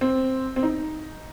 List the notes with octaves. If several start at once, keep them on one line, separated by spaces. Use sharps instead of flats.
C4
C4
D#4